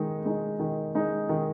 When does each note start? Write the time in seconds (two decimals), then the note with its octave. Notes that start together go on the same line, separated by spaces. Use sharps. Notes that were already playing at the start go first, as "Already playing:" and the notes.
Already playing: D#3 G#3 D#4
0.25 G#3 D#4
0.59 D#3
0.95 G#3 D#4
1.29 D#3